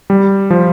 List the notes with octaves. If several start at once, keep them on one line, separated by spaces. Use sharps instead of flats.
G3
F3